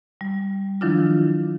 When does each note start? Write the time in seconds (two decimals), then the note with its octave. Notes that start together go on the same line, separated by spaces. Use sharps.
0.21 G3
0.81 D#3 F3 F#3 D4 E4 F4